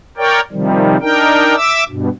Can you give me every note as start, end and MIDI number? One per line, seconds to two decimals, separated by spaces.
0.17 0.40 70
0.17 0.40 73
0.17 0.40 74
0.17 0.40 79
0.52 0.97 48
0.52 0.97 51
0.52 0.97 53
0.52 0.97 55
1.01 1.55 62
1.01 1.55 63
1.01 1.55 70
1.01 1.55 79
1.56 1.84 76
1.56 1.84 86
1.56 1.84 88
1.89 2.09 43
1.89 2.09 47